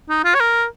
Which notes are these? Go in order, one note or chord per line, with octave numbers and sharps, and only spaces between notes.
D#4
F4
C#5
A#4